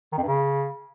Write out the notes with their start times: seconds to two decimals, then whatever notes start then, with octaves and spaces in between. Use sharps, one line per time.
0.12 D#3
0.17 F2
0.23 G2
0.28 C#3